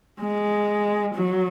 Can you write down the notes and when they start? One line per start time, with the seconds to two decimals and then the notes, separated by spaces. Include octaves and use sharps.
0.20 G#3
1.15 F#3